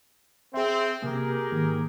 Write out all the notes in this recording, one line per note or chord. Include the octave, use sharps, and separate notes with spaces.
C4 G#4 E5
C3 A#3 G4 G#4 A#4
G#2 D#3 A#3